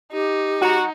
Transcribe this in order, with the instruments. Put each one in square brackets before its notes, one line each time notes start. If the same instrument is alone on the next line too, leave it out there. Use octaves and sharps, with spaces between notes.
[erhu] D#4 [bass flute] G4
[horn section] F#4 [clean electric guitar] F#5 A#5